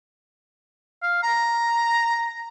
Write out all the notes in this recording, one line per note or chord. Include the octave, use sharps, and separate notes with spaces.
F5
A#5